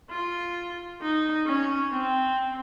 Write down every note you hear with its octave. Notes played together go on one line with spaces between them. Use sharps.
F4
D#4
C#4
C4